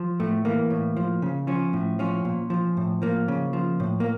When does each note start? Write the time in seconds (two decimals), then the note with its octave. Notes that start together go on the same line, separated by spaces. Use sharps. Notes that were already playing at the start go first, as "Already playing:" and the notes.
Already playing: F3
0.20 A2 A3
0.45 E3 A#3
0.70 A2
0.97 F3
1.22 C#3
1.47 F3 C#4
1.73 A2
1.99 F3 C#4
2.25 A#2
2.50 F3
2.77 A2
3.02 F3 A#3
3.28 C#3
3.53 F3
3.80 A2
4.00 A#3